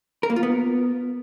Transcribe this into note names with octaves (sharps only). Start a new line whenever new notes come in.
A#4
A#3
F4
B3